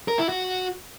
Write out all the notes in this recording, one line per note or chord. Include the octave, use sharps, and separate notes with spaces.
A#4
E4
F#4